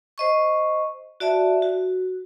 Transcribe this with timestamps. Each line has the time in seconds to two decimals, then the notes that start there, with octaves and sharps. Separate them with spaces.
0.18 C5 D#5 C#6
1.20 F#4 D5 E5 A5
1.62 F#4